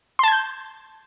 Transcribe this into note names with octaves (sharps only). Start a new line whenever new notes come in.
A5 C6 G6 G#6